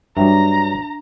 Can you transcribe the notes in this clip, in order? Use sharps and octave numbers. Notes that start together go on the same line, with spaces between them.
G2 F#3 D4 E5 G5 A#5